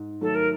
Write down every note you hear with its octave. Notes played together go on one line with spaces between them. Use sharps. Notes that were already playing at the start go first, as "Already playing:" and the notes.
Already playing: G#2
D#3 F#3 A3 A4
A#4